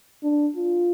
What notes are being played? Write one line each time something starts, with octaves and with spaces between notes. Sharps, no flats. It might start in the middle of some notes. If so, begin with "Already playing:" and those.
D4
F4